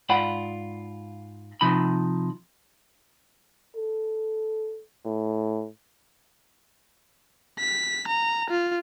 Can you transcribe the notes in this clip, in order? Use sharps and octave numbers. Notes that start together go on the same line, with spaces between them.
G#2 F4 D5 F#5 B5
C3 F3 D#4 B5
A4
A2
B6
A#5
F4